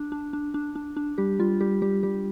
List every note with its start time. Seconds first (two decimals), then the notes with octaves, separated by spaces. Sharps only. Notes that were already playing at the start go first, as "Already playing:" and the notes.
Already playing: D4
0.12 D4
0.33 D4
0.54 D4
0.75 D4
0.97 D4
1.18 G3 G4
1.39 G3 F4
1.61 G3 G4
1.82 G3 G4
2.03 G3 G4